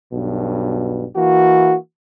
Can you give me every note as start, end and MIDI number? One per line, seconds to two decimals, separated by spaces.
0.13 1.06 35
0.13 1.06 43
0.13 1.06 47
1.15 1.76 52
1.15 1.76 58
1.15 1.76 66